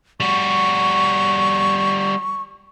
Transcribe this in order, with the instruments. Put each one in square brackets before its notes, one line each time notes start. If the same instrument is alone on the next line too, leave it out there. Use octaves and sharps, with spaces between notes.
[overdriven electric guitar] G3 F#4 [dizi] C#6